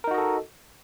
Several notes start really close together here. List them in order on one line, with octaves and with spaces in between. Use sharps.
A#4 D#4 F#4 D#5 A4